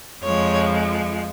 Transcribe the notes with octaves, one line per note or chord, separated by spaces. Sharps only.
F2 F3 G#3 C#5